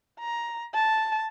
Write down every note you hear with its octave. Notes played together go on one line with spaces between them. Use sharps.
A#5
A5